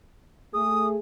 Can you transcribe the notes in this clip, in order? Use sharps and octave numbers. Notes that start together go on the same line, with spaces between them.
A3 G#4 D#6